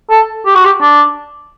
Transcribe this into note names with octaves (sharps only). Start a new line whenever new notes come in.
A4
G4
F#4
G4
D4